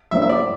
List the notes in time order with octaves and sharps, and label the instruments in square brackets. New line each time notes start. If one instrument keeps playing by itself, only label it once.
[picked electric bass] F3 A#3 D4 [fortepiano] E5
[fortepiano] E5
D5